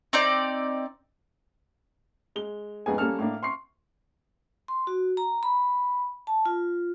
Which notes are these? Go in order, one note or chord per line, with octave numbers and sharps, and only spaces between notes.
C4 D#4 D5
G#3 G7
F2 G#2 B3 D#4 G#4 G#5
G3 A#3 C#4 A4 A5 F6
A2 A#3 D4
C6 C#6 C7
C6
F#4
A#5
B5
A5
F4